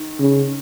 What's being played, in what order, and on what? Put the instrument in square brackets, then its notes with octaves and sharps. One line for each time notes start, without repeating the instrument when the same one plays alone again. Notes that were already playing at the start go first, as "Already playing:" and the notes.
Already playing: [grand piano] D#3
[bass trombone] C#3